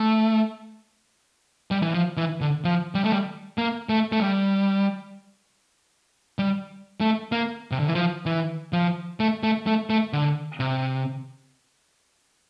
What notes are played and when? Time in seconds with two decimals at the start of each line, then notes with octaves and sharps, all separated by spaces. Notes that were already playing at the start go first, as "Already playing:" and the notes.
Already playing: A3
1.71 G3
1.82 E3
1.94 F3
2.17 E3
2.41 D3
2.65 F3
2.95 G3
3.04 A3
3.12 G3
3.58 A#3
3.89 A3
4.12 A3
4.20 G3
6.39 G3
7.01 A3
7.32 A#3
7.72 C3
7.79 D3
7.87 E3
7.95 F3
8.26 E3
8.73 F3
9.20 A3
9.43 A3
9.67 A3
9.90 A3
10.13 D3
10.60 C3